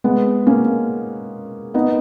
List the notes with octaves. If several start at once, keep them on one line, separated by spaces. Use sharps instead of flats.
G#3 B3
A#3 C#4
B3 D#4